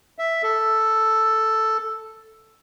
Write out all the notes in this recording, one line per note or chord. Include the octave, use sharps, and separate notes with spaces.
E5
A4